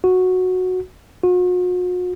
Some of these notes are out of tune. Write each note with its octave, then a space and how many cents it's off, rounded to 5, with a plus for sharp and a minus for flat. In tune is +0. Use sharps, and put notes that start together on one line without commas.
F#4 -10
F#4 -45